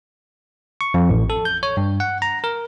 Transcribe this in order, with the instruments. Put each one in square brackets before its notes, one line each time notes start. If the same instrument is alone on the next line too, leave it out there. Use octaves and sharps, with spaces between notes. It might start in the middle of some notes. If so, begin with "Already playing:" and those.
[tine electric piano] C#6
F2
A1
A4
G6
C#5
G2
F#5
A#5
A#4